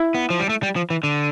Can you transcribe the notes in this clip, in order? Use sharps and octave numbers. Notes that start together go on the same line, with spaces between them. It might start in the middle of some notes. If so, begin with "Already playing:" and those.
Already playing: E4
B3
F3
G3
A3
G3
F3
E3
D3